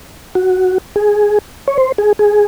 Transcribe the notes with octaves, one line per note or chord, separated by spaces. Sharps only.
F#4
G#4
C#5
C5
G#4
G#4